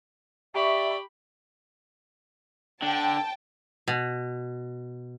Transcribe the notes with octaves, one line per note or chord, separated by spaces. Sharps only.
G4 D5 E5 B5 C#6
D3 G5 A5
B2